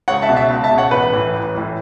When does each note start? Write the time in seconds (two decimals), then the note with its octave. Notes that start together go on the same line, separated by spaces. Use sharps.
0.08 C#2 C#5 F#5
0.22 E5 A5
0.29 B2
0.36 E5 A5
0.50 C#2
0.64 E5 A5
0.71 B2
0.78 C#5 F#5
0.91 A1 B4
1.13 A2 E3
1.33 A1
1.55 A2 E3